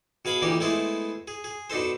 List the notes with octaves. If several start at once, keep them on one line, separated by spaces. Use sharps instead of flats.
B2 G#4 F5 G#5 B5
A#2 D3 E3 A#3 D#4 G4
G#3 A3 B3 E4 G#4 C5
G#4
G#4
B2 D4 D#4 A4 C5